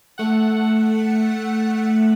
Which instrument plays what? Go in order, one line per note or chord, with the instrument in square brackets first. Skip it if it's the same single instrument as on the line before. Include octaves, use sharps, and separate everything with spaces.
[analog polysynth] A3 F#5